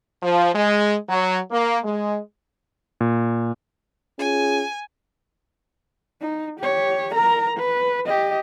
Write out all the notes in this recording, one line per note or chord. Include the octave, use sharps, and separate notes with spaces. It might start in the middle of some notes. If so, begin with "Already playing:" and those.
F3
G#3
F#3
A#3
G#3
A#2
C#4 F4 G#4 G#5
D#4
G4 C#5
A#4 A#5
B4
G4 D#5